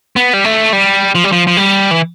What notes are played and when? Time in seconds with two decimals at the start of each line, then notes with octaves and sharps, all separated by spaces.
0.16 B3
0.33 G3
0.45 A3
0.73 G3
1.15 F3
1.24 G3
1.32 F3
1.47 F3
1.57 G3
1.91 E3